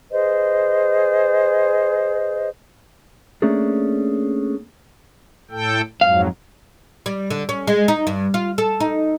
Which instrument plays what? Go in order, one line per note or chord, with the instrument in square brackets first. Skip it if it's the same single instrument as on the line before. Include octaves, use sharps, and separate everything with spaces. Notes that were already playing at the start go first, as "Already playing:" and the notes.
[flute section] G#4 B4 C5 D#5
[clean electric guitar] A3 A#3 C#4 D4 G#4 A4
[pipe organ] A2 A4 G5
[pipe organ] F2 G#2 F#3 [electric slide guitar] F5
[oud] G3
D3
C#4
G#3
D#4
G2
F4
A4
D#4